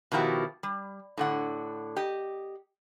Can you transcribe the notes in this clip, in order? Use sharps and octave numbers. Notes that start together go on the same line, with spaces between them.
B2 D#3 F3 E4 F#4 G4
G3
A2 D3 F#5
G4 D#5